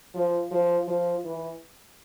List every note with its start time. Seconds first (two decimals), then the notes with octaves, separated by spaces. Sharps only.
0.14 F3
0.51 F3
0.88 F3
1.24 E3